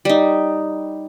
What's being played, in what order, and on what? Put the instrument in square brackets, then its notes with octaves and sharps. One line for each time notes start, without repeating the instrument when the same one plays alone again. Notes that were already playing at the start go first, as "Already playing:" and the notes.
[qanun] G3 D#4